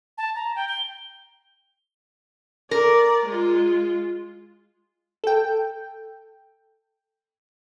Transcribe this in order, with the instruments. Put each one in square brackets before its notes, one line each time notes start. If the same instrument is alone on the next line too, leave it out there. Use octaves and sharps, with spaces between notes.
[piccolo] A5
A#5
G5
G7
[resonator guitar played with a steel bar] A#4 [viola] D5
[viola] G#3 F4
[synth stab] A4 G5